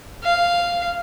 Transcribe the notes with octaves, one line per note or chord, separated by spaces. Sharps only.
F5